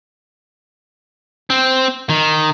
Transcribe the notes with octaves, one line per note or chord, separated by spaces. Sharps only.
C4
D#3